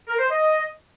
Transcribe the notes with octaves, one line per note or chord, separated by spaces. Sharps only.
A#4
C5
D#5